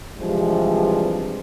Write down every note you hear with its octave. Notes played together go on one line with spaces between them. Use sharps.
G2 C3 E3 F3 G3 G#3